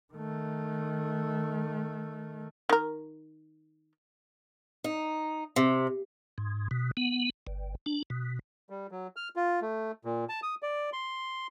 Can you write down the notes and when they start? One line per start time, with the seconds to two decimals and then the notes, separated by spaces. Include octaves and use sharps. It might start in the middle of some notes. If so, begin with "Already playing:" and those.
0.13 D#3 A3
2.69 D#3 A#4
4.84 D#4
5.56 C3
6.38 G#2
6.71 B2
6.97 B3
7.47 G1
7.86 D4
8.10 B2
8.70 G3
8.91 F#3
9.16 F6
9.36 F4
9.62 A3
10.05 A#2
10.29 A5
10.43 D#6
10.63 D5
10.93 C6